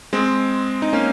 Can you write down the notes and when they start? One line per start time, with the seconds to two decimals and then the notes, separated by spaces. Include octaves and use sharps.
0.13 G#3 C4
0.82 D#4
0.93 A#3 C#4